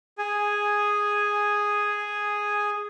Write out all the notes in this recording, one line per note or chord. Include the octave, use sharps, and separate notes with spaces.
G#4 G#5